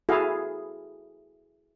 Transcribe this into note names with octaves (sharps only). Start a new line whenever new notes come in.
E4 F#4 G#4 A4 F5